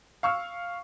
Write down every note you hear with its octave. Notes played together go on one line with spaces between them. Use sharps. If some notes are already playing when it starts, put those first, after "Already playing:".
F5 C#6 E6 F6